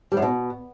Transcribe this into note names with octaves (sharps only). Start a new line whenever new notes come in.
G3
F#2
B2